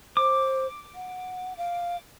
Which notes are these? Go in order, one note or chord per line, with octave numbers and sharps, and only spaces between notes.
C5 D6
F#5
F5